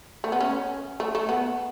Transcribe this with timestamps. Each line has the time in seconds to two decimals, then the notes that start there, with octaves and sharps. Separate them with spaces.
0.24 A3
0.32 B3
0.40 C#4
1.00 A3
1.15 A3
1.29 B3